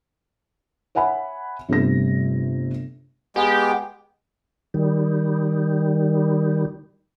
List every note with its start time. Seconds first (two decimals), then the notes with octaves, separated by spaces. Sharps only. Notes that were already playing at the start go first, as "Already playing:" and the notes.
0.95 C#5 E5 F#5 G#5 B5
1.69 G1 C3 G3 A3 A#6
3.36 G#3 B3 G4
4.74 D#3 G3